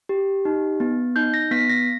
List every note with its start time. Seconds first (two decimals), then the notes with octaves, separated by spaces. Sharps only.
0.09 G4
0.45 D#4
0.80 B3
1.16 D#4 G6
1.34 A#6
1.51 B3 B6
1.70 A#6